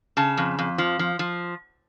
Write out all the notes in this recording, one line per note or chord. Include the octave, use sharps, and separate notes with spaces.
C#3 A5
F2
F2
F3
F3
F3